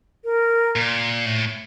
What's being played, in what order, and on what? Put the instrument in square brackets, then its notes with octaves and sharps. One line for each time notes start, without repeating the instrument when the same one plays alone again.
[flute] A#4
[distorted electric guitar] A#2
A2